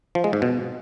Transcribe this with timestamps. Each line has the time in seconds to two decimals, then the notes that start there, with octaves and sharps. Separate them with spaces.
0.15 F3
0.24 G#3
0.33 G#2
0.42 B2